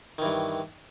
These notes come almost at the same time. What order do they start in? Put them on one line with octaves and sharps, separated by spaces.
D#3 E3 G2